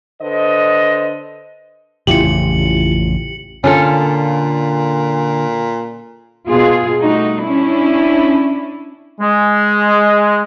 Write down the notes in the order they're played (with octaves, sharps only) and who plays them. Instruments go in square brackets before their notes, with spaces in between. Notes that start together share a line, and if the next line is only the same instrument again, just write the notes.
[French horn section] D3 B4 C5 D#5
[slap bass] A1 F2 C#3 [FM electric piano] E4 F4 G4 [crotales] C#7 F#7
[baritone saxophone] A#2 [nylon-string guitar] D3 [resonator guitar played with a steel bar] C#4 F4 A4
[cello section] B2 F4 G#4
G3 A3 D#4 F#4
C#4 D4 E4
[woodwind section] G#3